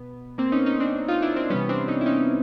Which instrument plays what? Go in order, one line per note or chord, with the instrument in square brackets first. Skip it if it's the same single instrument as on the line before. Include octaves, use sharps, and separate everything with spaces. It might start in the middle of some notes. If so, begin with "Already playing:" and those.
Already playing: [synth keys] B2 B3
A#3 C4
C#4 D#4
C#4 D#4
C4 D4
D#4 F4
D4 E4
C4 D4
C3 E3 G3 B3 C#4
C4 D4
C#4 D#4
E4
C#4 D#4